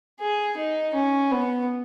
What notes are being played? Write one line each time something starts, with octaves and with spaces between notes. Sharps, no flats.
G#4
D#4
C#4
B3